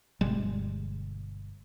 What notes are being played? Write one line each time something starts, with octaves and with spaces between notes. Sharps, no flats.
G1 B2 G3 G#3